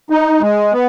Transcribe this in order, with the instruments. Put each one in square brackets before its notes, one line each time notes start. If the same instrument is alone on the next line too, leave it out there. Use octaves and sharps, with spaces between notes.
[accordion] D#4
G#3
B3